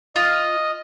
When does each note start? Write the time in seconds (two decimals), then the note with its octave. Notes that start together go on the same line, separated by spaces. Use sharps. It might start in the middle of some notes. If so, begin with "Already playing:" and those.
0.16 F4 D#5